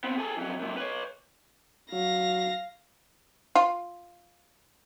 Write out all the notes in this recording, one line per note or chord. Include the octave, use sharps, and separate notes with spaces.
B3 C4
G#4 A4
F2 F#3
F#2 A#2
B4 C#5
F#3 F5 A#6
F4